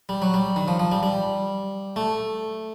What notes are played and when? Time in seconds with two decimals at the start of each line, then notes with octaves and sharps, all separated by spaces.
0.09 G3
0.22 F#3
0.34 G3
0.56 D#3
0.68 F3
0.80 F3
0.92 G3
1.03 G3
1.96 A3